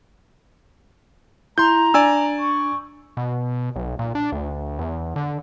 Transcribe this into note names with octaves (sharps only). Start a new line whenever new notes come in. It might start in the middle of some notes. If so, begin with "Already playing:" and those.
E4 A#5 C6 G6
D4 D5 G#5 E6
C#6
B2
B1
A#2
D4
D2
E2
D3